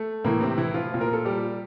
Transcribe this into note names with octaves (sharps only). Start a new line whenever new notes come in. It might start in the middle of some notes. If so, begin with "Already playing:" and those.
Already playing: A3
A2 E3 A#3
C3 C4
E3 E4
F3 F4
A#2 F3
A#4
A4
G3 G4